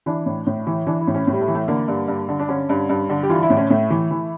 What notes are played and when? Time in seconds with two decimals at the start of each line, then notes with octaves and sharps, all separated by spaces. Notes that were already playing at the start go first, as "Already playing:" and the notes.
0.06 E3 D4
0.26 A2
0.47 A2
0.67 E3
0.87 E3 D4
1.01 E4
1.08 A2
1.14 C#4
1.27 A2 G3
1.41 A3
1.48 E3
1.54 A3
1.68 D3 A#3
1.88 G2
2.08 G2
2.29 D3
2.40 D4
2.49 D3 C#4
2.69 G2
2.89 G2
3.10 D3
3.23 G4
3.29 E3 F4
3.43 E4
3.50 A2
3.57 C#4
3.70 A2 A3
3.90 E3
4.11 E3